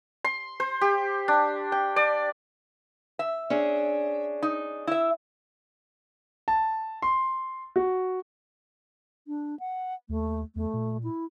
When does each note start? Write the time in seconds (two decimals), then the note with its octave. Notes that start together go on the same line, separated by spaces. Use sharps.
0.24 C6
0.60 C5
0.81 G4
1.28 D4
1.72 G5
1.96 D5
3.19 E5
3.50 C#4 D4 G#4
4.43 D#4
4.87 E4 E5
6.48 A5
7.02 C6
7.76 F#4
9.28 D4
9.60 F#5
10.09 D#2 A3
10.56 E2 A3
10.73 A#2
11.03 E4